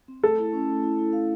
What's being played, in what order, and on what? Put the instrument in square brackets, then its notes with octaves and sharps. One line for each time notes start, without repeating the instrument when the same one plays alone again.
[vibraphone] C4
[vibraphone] A3 [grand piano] A4
[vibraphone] E4
C#4
A3
E4
E4
F5